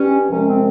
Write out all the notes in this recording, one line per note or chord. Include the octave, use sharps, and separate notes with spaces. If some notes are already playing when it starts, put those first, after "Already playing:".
Already playing: G2 G3 C#4
C2 C3 F3 G#3 C#4
C4